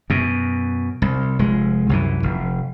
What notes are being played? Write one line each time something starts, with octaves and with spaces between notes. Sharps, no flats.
F#2 B2
C2
F1 G#3
C2 F#2 E3
F1